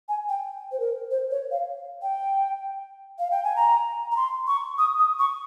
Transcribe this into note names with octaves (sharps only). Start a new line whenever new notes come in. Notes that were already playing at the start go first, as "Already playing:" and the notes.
G#5
G5
C5
A#4
C5
C#5
F5
G5
F5
G5
G#5
A#5
A#5
C6
C#6
D#6
D#6
C#6